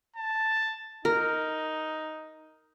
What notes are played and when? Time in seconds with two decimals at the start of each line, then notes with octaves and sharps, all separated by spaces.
0.16 A5
1.05 D#4 A#4